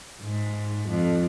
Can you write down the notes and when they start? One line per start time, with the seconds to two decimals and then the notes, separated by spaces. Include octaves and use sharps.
0.21 G#2
0.88 F2